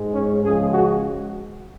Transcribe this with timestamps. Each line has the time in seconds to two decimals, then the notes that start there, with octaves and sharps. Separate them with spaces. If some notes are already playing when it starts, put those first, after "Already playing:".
Already playing: G#2 G#3
0.13 C#4
0.43 C#2 C#3 F3 G#3 G#4
0.72 F#4